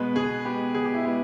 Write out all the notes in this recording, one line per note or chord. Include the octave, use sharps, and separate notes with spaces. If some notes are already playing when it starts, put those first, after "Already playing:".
Already playing: B2 G#3 B3 B4
B2 G#4
G#3 B3 G4
B2 G#4
G4
E4
G#3 B3 G4